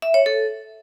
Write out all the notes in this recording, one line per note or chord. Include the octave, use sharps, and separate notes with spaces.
E5
C#5
A4